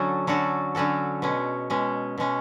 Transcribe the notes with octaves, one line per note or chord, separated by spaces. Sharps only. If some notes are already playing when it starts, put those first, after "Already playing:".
Already playing: D3 F#3 C#4 F#4 A4
D3 F#3 C#4 F#4 A4
D3 F#3 C#4 F#4 A4
B2 G#3 C#4
B2 G#3 C#4
B2 G#3 C#4